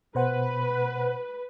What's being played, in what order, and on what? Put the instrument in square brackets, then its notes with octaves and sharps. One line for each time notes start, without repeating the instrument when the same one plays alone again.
[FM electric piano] B2 C5 F#5 [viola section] B4